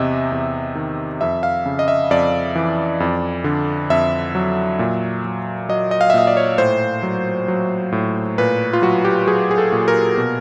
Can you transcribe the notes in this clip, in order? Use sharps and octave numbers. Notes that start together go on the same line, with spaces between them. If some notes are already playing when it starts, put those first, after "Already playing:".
Already playing: E2 C3 D#5 E5
E2
D#3
F2 E5
F5
C#3
D#5
E5
F2 D5
E3
F2
D3
F2 E5
F#3
A#2
F#3
F#3 D#5
D#5
F5
E5
A#2 D#5
D5
C#5
A2 C5
F#3
F#3
A2
A#2 B4
F4
F#3 F#4
G4
F#3 G#4
G#4
A4
A#2
A#4
B2